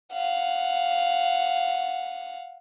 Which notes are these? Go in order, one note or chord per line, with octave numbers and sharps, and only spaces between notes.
F5 F#5